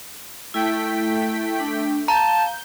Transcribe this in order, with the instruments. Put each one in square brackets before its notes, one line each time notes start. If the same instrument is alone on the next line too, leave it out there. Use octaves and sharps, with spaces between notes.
[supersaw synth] A3 G5 B6 [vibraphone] E4
[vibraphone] D4
[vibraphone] F5 [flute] A5 [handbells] A#5 [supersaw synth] G6